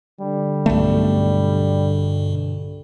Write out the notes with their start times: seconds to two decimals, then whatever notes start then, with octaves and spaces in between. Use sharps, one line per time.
0.21 D3 G3
0.66 B1 G2 B2 A3